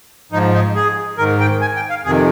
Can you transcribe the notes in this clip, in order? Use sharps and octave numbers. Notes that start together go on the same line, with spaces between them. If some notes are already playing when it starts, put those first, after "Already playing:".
G#2 F3 D#4
D#4
G#4
G#2 D#3 A#4
G5
G#5
G5
F5
F2 C3 D#3 G#4